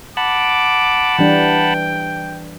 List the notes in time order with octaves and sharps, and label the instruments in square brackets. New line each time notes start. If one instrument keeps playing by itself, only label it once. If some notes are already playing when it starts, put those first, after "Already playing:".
[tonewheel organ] F#5 A5 B5 [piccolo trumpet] D6
[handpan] E3 G3 D4 [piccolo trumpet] G5